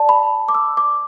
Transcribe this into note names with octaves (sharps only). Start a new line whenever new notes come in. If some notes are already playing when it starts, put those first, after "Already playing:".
Already playing: D5 A5
B5
D6
E6
D6